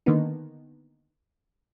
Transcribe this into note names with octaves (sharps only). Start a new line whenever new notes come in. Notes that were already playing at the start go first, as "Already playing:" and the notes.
D3 D#3 A#3 B3 D#4